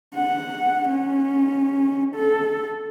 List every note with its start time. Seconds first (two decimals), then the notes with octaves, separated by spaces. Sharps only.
0.15 F#5
0.89 C#4
2.15 A4